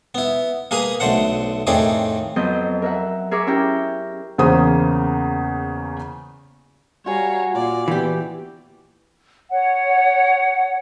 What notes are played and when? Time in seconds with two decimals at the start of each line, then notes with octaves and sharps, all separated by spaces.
0.15 B3 E4
0.71 A#3 G#4 B4 G#5 A#5 D#6
1.00 B1 D3 A3 C5 F#5
1.67 F2 A2 D#3 C4 G#4 D5
2.36 F2 F#3 B3 D#5 G6
2.82 A#4 E5 F#5
3.31 G#4 A#4 E5 C#6 D6
3.47 C#4 E4 G4 G5 A#5
4.38 E2 C#3 A#3 C5 D#6
7.06 G3 F#4 C#5 F5 G#5 A#5
7.53 A#2 F4 D5
7.88 E3 B3 G4
9.51 C#5 F#5